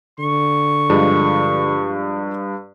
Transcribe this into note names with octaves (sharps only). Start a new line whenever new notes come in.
D3 C#6
G2 F3 G#3